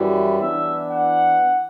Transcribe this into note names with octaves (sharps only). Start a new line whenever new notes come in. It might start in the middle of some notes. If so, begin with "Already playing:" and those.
Already playing: F#2 E3 G3 C#4 E4
E3 B3 D4 E5
F#5